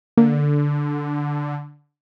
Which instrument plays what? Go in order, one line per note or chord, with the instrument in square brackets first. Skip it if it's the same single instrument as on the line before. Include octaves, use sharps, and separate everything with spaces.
[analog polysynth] D3 [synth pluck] A#3